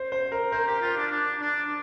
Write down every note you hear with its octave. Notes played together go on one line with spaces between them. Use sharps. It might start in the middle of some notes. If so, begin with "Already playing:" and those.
Already playing: C5
C5
A#4
A#4 C5
G4
F4
D4
D4
D4